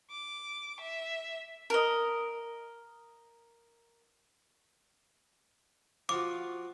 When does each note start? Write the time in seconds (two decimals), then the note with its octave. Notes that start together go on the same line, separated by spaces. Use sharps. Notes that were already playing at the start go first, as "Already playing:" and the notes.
0.11 D6
0.80 E5
1.70 A#4 D#5
6.09 F3 F4 F#4 D6